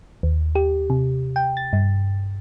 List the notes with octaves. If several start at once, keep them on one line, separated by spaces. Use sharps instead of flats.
D#2
G4
C3
G5
A6
G2